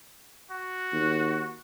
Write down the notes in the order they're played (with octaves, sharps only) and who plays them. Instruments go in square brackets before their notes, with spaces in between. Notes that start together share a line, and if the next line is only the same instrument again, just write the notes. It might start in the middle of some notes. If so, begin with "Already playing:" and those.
[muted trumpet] F#4
[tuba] D#2